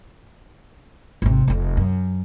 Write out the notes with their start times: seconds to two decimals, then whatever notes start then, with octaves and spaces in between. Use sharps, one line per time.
1.22 G#1 C3
1.48 F1 F2
1.77 F#2